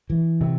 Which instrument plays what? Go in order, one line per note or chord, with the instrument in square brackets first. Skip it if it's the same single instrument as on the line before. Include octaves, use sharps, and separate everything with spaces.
[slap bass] E3
C3